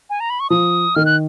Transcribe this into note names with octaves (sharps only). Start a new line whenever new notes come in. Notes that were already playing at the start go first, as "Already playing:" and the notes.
G#5
A#5
B5
C#6
F3 D#6
D#3 F6
F#6